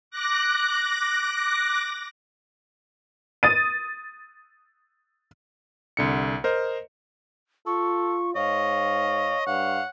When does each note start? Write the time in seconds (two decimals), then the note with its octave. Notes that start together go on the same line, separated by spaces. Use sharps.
0.11 D6 F#6 A#6
3.43 D#6 A6 D#7
5.97 C2 D3 C#7
6.44 A#4 C5 D#5
7.66 F4 A4 C#6
8.36 G#2 C#5 D#5 F5
9.47 G2 F5 F#5